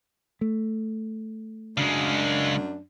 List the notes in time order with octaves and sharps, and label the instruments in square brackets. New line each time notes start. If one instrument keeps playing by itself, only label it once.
[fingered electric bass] A3
[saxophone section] F#2 D4 [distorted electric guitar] C#3 G#3